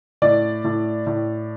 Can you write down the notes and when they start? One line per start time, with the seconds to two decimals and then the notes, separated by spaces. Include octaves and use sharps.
0.22 A2 D5
0.64 A2
1.07 A2